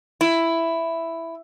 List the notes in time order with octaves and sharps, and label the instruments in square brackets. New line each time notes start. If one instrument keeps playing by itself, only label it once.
[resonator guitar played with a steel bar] E4